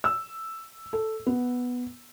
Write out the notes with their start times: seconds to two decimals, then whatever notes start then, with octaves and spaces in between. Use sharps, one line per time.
0.04 E6
0.93 A4
1.27 B3